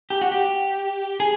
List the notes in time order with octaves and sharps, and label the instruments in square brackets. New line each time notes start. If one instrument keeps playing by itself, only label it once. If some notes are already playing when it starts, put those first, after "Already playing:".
[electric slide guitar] G4
F#4
G4
G#4